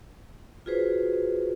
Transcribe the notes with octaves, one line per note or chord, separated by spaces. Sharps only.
F4 F#4 G#4 B4 C5